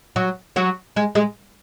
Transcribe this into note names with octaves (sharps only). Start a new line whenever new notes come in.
F#3 F#4
F#3 F#4
G#3 G#4
G#3 G#4